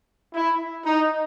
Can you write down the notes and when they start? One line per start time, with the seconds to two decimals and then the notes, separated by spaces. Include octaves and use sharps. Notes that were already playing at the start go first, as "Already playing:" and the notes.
0.34 E4
0.85 D#4